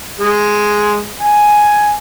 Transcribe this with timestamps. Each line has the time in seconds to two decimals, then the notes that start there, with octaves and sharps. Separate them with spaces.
0.20 G#3
1.21 G#5